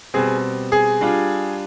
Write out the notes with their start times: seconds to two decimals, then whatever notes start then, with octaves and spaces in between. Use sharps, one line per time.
0.14 B2 G3 C4 G#4
0.72 G#4
1.01 G3 D4 F4